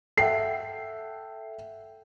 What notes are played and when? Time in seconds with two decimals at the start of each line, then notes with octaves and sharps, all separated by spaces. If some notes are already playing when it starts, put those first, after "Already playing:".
0.17 A4 E5 F#5 G5 C7